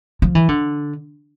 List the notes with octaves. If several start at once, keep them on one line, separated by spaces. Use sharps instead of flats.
F3
E3
D3